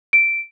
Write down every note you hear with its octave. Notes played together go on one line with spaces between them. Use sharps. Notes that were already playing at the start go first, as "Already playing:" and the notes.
D7